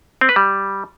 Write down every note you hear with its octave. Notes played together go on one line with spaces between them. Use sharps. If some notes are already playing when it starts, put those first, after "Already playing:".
C4
B4
G3